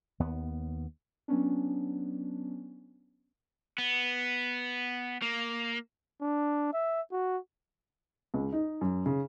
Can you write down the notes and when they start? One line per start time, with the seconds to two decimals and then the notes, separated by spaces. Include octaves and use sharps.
0.20 D#2 B3
1.28 F#3 B3 C#4 D4
3.78 B3
5.22 A#3
6.22 D4
6.73 E5
7.12 F#4
8.34 C#2
8.53 D#4
8.81 F#2
9.06 C#3